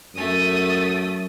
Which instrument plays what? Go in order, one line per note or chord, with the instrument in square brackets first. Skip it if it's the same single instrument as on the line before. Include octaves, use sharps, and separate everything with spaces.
[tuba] F#2 [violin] A3 D#6